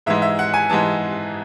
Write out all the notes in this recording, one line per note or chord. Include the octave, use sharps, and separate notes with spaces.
G#2 E3 G#3 E5
E5
F#5
G#5
G#2 E3 G#3 A5